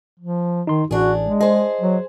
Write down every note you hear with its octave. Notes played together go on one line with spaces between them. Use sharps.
F3
D#3 D#4 C6
A1 D4 F#4 G#4
G#3
G#4 C5 D#5
F#3